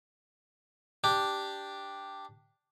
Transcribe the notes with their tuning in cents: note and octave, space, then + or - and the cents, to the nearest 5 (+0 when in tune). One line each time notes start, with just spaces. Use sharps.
D4 +0 G4 +0